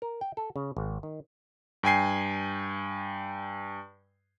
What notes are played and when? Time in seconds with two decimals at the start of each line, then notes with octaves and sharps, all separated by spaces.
0.02 A#4
0.21 G5
0.37 A4
0.56 C#3
0.77 G#1
1.03 D#3
1.83 G2 G5 G#5 C7